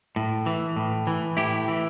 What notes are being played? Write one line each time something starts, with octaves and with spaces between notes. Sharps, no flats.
A2
E3
A2
E3
A2 E4 G4
E3